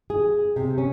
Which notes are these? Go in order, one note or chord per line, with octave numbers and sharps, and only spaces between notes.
G#4
C3
C#4